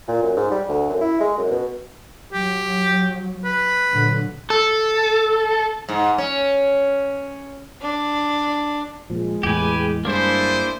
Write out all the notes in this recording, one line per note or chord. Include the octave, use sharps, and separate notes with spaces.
A#2
F#2
G#2
G3
D2
F#2
E4
G#3
F#2
B2
F#3 G4
B4
A#2 D3 F#3
A4
G#2
C#4
D4
A#2 F3 G#3
E2 A2 G4 B4 G5 G#5
G2 A#3 D4 E4 G#4 C5